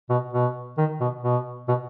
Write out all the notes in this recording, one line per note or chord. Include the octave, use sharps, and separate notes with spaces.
B2
B2
D#3
B2
B2
B2